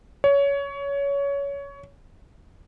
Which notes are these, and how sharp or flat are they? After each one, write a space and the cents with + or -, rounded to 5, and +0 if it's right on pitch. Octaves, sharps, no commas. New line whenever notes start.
C#5 +20